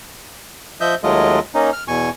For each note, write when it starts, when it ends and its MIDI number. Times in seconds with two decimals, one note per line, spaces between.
0.81 0.95 53
0.81 0.95 75
0.81 0.95 76
0.81 0.95 91
1.04 1.39 39
1.04 1.39 54
1.04 1.39 56
1.04 1.39 57
1.04 1.39 65
1.04 1.39 75
1.55 1.70 58
1.55 1.70 61
1.55 1.70 63
1.73 1.84 89
1.88 2.10 40
1.88 2.10 47
1.88 2.10 80
1.88 2.10 85